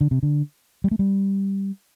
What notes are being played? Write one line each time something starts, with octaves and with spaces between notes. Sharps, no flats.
D3
C3
D3
G3
A3
G3